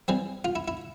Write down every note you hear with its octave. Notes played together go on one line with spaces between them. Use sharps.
E3 G3 C4
F4
E4
E4